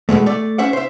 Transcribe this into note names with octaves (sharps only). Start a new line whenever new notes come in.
B2 E3 G#3 A3
A3 D5
C#4 C5 E5 F#5
C5 E5